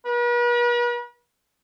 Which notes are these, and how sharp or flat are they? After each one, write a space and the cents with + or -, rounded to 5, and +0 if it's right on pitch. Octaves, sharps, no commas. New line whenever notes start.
B4 -45